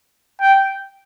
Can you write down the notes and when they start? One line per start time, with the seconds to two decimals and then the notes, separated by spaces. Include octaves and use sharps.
0.41 G5